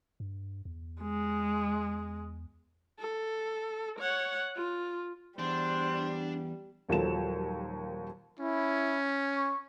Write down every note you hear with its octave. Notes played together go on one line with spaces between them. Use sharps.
G2
E2
G#3
A4
C#5 F#5
F4
E2 G3 D4 C5
D#1 D#2 F3 F#3 A4 E7
C#4 E4
C#6